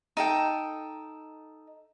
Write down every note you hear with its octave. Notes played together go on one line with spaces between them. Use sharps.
D#4 A4 G5